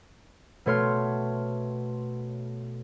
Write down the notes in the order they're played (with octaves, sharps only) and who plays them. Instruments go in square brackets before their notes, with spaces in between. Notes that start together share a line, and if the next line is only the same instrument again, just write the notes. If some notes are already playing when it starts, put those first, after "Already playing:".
[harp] B2 A3 C#5 C6 F6